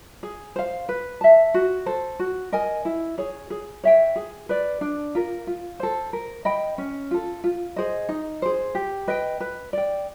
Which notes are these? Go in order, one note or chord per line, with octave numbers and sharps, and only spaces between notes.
G#4
C5 F5
B4
E5 A5
F#4
A4 C5
F#4
A#4 D#5 G#5
E4
G#4 C#5
G#4
C#5 E5 G5
G#4
B4 D5
D4
F4 A#4
F4
A4 C5
A#4
D#5 G5 B5
C#4
F4 A4
F4
G#4 C5 D#5
D#4
G#4 C5
G4
B4 D#5 G5
B4
D5 G5